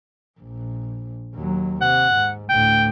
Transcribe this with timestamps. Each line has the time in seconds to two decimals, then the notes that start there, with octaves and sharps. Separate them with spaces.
0.41 A#1
1.35 D#2 F#3
1.81 C3 F#5
2.13 G#2
2.49 D2 A2 G5